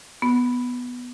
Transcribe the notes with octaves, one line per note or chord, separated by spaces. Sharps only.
B3